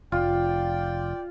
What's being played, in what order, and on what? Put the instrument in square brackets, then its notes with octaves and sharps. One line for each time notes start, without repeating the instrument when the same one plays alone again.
[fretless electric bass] F1 [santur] F4 [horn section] D5 G5